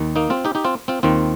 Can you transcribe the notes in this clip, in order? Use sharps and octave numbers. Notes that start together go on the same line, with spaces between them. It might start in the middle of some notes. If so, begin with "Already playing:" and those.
Already playing: D#2 D#3
A#3 D#4
C4 F4
D#4 G4
D#4 G4
C4 F4
C4 F4
D#2 D#3 C4 F4